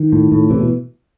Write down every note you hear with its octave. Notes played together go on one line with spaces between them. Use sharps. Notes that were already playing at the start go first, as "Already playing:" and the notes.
Already playing: D#3
A2
A2
C3 E3
B2